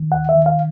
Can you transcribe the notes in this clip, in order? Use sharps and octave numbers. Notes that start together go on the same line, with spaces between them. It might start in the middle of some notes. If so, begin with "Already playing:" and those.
Already playing: D#3
D#2 F#5
E5
D#3
F5